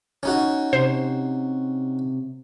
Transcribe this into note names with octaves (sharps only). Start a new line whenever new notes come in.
C#4 D#4 F#4
C3 C5